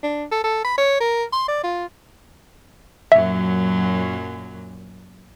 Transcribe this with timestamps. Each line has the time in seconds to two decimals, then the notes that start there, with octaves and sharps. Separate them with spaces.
0.03 D4
0.31 A4
0.44 A4
0.64 B5
0.78 C#5
1.00 A#4
1.32 C6
1.48 D5
1.64 F4
3.12 F#2 A#2 F#3 E5